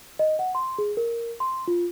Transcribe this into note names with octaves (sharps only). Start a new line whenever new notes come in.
D#5
F#5
C6
G#4
A#4
C6
F4